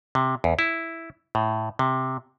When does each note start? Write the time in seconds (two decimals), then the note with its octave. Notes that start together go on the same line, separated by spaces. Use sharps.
0.15 C3
0.44 E2
0.59 E4
1.35 A2
1.79 C3